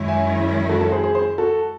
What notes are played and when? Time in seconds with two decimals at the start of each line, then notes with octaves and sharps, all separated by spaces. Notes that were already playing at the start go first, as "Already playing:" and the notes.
Already playing: F#2 D#3 G#3 C#4 E4
0.08 E5 G#5
0.69 F#4 A4
0.81 F#4 A4
0.92 G#4 C5
1.04 G#4 C5
1.15 G#4 C5
1.38 F#4 A4